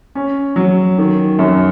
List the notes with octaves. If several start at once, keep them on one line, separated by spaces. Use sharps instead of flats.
C#4
F#3
D#3
F#2